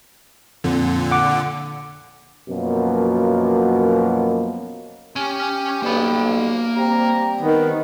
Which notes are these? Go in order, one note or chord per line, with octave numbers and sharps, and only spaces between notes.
F2 A#2 D3
F#5 D6
F#2 B2 F3 A#3
C#4 G4 G#5
B1 G2 A#3 B5
G3 C4 G4 A#5
D#3 B3